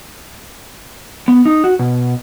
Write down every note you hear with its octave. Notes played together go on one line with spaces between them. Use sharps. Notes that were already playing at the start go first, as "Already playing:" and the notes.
B3
D#4
F#4
B2